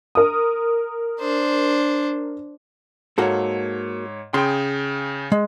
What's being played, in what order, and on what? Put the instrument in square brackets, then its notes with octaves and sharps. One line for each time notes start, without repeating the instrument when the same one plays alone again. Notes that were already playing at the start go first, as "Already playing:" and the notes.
[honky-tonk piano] A#4 D#6
[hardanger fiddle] D4 C5
[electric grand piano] G#2 C#5 [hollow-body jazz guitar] A#3 F#4 A4
[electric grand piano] C#3 G#4 G5 [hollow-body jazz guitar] C6
[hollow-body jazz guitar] G#3